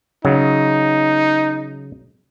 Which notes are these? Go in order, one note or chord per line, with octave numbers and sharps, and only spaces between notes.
C#3 F#3 D#4